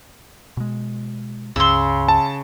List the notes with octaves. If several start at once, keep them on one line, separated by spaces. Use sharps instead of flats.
B2 G#3
C#2 G2 C#3 C6 E6
A5